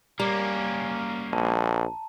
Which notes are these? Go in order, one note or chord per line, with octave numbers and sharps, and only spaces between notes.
G3 A#3 C#4 A#5
A#1 A5